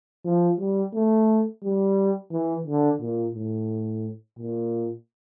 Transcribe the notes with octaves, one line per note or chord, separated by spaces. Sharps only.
F3
G3
A3
G3
E3
D3
A#2
A2
A#2